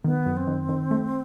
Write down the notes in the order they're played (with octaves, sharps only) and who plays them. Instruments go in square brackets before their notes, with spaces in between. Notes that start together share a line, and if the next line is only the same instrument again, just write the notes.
[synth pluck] D#3 [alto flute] B3
[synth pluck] F#2
[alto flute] C4
[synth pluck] D#3
D#3
A3